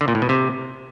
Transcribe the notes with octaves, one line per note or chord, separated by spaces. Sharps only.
D3
A#2
A2
B2
C3